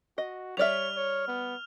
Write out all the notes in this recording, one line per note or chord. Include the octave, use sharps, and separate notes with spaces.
F#4 D#5
G3 C#5 D5 E5 F6 F7
C#5
B3